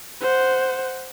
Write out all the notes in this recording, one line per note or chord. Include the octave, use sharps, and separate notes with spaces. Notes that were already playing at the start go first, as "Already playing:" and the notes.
C5 F#5